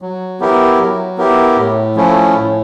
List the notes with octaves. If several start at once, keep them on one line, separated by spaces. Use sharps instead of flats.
F#3
B3 E4 G4 A#4
F#3
B3 E4 G4 A#4
A2
F3 A3 C#4 E4
A2